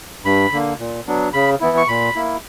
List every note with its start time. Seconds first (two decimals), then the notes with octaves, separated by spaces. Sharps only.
0.25 G2 B5
0.52 D3 A#3
0.79 A#2
1.07 F#3 B3 D4
1.33 C#3 B5
1.61 E3 B3 E4
1.77 C#6
1.88 A#2 B5
2.15 A#3 E4